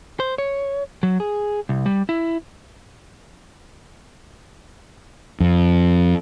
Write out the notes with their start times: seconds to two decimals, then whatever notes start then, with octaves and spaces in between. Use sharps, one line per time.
0.20 C5
0.38 C#5
1.03 F#3
1.20 G#4
1.69 C2
1.86 G3
2.09 E4
5.40 F2